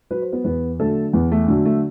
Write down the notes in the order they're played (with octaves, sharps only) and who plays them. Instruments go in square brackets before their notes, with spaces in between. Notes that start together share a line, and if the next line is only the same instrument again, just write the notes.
[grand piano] F#3 B4
C5
B3 B4
E2 B3 B4
D3 F#3 A3 A4
E2 B3
A3
D3 F#3 A3
A3